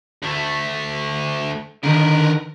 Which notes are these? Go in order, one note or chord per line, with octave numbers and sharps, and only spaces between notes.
D2 A3
D3 D#3 A#4 B4